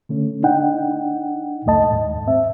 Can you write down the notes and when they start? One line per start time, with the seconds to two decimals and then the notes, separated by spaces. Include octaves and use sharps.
0.09 D3 A3 C#4
0.43 D4 D#4 F#5 G5
1.66 C#2 F#2 A3 D#5 A5
1.90 D#2 G#2
2.27 C4 E5